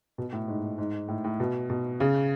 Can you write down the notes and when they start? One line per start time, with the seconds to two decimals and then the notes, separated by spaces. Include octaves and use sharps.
0.18 B2
0.33 A2
0.48 G#2
0.78 G#2
1.08 A2
1.24 A2
1.40 B2
1.70 B2
2.00 C#3